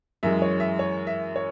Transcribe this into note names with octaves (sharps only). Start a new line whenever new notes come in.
F#2 E3 G#3 E5
C#5
E5
C#5
E5
C#5